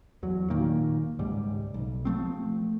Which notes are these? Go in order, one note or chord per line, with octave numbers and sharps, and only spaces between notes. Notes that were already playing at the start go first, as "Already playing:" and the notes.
E2 F#3
A#2 D#3 A#3
C#2 G#2 G3
B1
F3 A3 C4